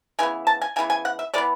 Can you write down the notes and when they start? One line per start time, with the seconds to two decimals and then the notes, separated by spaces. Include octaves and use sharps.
0.19 C#3 E3 B3 G#5
0.47 A5
0.61 G#5
0.76 C#3 E3 B3 G#5
0.90 G#5
1.05 F#5
1.19 E5
1.34 E3 G#3 D5
1.38 B3